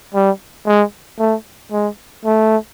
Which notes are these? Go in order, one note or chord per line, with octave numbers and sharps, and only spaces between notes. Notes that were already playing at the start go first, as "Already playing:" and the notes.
G3
G#3
A3
G#3
A3